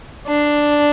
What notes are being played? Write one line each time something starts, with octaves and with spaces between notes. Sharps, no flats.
D4